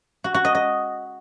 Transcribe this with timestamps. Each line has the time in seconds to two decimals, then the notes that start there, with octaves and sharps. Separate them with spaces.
0.24 F#4
0.34 F#4
0.45 D#5
0.55 D#5